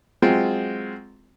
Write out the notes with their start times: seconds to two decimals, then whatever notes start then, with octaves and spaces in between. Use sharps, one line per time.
0.22 F#3 G#3 C4 F4